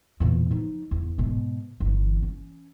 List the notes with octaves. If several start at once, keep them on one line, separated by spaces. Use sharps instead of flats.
E2 A#2
F3 D#4
E2
G#2 B2
G1 E3
C#4